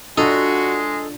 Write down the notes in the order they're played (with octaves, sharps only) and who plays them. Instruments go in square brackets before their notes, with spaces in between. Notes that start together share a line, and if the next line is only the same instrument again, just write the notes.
[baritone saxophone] G#3 [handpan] D4 F4 [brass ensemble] F#4 [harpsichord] A4 D#5 A#5